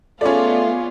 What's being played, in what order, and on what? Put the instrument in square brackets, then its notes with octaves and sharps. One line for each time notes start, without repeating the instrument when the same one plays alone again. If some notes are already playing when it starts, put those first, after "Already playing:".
[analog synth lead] A3 [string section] B3 F4 G#4 [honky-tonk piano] C#4 D5